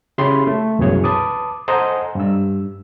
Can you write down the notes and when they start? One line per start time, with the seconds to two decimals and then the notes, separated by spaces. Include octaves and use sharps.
0.18 C#3 E4 G4 C#5 B5 C6
0.47 A3
0.79 C2 F#2 B2 E3 G#4 C#5
1.04 B4 A5 D6 D#6
1.68 A4 C5 D#5 F#5 G#5 A#5
2.15 G2 E6